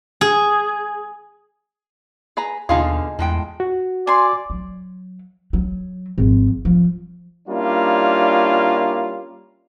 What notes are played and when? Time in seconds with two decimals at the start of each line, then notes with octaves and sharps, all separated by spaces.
0.21 G#4
2.37 G#4 B4 A#5
2.69 D#2 B2 D3 D#4 F4 G#4 F5
3.19 E2 A2 G#3 G5
3.60 F#4
4.07 D5 G#5 C6
4.50 F#3
5.53 F#3
6.18 G#1 F3
6.65 F3
7.48 G3 A#3 C#4 D4 E4 F4